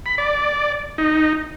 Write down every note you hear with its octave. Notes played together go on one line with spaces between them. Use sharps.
B5
D5
D#4